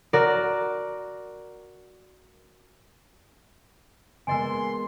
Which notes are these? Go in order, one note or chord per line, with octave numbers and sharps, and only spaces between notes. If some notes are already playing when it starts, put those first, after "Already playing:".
F#4 A#4 D5
G#3 A#3 B3 A#4 D#5 G#5 C6